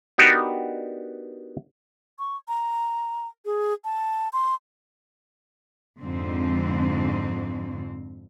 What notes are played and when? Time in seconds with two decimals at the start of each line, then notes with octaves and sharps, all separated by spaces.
0.18 B3 D4 D#4 F#4 G4 A#4
2.19 C#6
2.48 A#5
3.45 G#4
3.84 A5
4.33 C6
6.00 F2 G#2 D3 C4